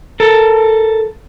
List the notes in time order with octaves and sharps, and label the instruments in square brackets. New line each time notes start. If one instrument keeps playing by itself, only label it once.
[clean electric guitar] A4 A#4